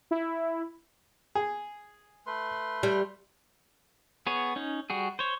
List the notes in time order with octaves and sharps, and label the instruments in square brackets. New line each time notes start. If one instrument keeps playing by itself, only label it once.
[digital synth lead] E4
[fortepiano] G#4
[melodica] A3 B4 C6
[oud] G3
[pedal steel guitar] B3 G#4 C#5
C#4 D#4
G3 F#4 G#4
C5 C#5